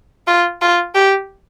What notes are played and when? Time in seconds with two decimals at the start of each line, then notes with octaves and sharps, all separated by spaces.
0.27 F4
0.62 F4
0.95 G4